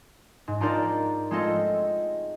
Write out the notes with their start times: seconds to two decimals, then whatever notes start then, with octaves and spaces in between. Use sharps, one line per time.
0.48 G#2
0.60 D4 D#4 F4 A#4 C5 D5
1.31 G#3 A3 C4 F4 A4 D#5